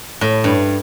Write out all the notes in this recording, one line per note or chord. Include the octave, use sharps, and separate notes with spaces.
A2
G2